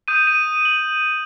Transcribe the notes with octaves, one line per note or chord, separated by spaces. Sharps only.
D#6 G6 D#7
D#7
F#7